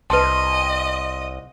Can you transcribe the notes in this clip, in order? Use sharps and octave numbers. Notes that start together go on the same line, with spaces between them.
C2 B4 D#5 A5 C6